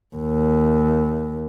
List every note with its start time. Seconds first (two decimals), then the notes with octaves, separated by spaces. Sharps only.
0.16 D#2